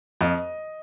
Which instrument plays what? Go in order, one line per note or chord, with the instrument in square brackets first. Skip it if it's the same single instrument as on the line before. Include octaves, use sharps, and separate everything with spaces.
[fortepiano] F2 [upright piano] D#5